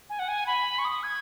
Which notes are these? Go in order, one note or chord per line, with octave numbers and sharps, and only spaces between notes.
G#5
F#5
G#5
B5
C#6
D#6
G#6